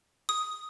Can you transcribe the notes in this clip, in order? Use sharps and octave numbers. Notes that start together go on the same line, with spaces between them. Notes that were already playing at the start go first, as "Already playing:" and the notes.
D#6